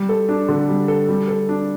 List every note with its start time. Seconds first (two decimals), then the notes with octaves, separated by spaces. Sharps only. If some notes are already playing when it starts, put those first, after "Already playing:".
Already playing: G3
0.09 A4
0.29 D4
0.49 D3
0.69 G3
0.88 A4
1.09 G3
1.28 A4
1.49 D4